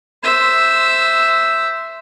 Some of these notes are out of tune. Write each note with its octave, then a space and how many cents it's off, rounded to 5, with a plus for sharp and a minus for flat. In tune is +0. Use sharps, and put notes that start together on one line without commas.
C5 -10 E5 +0